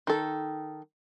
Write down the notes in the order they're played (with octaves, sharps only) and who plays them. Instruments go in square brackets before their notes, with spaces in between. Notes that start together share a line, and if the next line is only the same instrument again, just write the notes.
[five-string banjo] D#3 A4